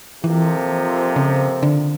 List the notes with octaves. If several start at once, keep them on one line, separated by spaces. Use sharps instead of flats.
F2 C3 E3 F3 A#3
C#3
D3